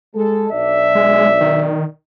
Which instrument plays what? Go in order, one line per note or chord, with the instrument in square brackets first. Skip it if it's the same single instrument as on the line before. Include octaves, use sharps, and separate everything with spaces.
[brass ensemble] G#3 A4
[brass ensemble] B1 D4 D5 [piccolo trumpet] E5
[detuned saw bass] G#3
D#3